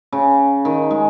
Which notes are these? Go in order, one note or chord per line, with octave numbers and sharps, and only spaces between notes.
C#3
D#3
G#3